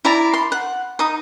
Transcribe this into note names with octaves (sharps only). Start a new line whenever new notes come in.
E4 D5 A#5
C6
F#5
D#4 D#6